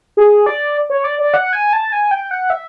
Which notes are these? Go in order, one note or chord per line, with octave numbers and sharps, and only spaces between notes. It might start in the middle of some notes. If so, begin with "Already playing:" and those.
G#4
D5
C#5
D5
D5
F#5
G#5
A5
G#5
G5
F#5
E5